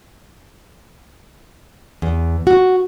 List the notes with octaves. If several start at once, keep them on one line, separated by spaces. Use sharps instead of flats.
E2
F#4